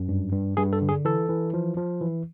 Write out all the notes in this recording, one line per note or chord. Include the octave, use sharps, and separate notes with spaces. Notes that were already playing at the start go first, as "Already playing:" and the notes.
Already playing: F#2
G2
G2
G2 G#4
A4
D3
G#4
E3 A4
E3
F3
F3
E3